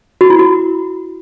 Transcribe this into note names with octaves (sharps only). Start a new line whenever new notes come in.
F#4
E4
F#4